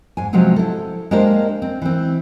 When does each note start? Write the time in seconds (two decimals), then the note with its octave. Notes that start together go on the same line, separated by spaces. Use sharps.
0.17 G#2 G#5
0.33 C3 F3 F#3 G#3 B3 C4
0.56 E4 A4
1.11 G#3 A#3 D4 G4 A#4 C5
1.62 C4
1.82 E3 C4